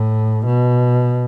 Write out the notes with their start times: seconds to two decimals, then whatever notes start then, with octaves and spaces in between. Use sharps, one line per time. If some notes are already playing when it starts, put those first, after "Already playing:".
Already playing: A2
0.46 B2